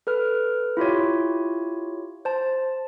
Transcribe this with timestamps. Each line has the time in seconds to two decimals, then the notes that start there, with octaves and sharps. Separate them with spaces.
0.07 A4 B4 F6
0.77 E4 F4 G4 C#5
2.25 C5 A5